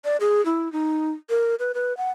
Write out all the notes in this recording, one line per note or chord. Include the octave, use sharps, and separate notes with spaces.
D5
G#4
E4
D#4
A#4
B4
B4
F#5